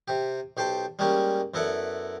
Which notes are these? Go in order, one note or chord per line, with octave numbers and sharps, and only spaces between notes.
C3 G4
B1 G4 C5 G5 A5
G3 G#3 A#3 C#4 G4
F#2 B3 E4 A4 D5 F#5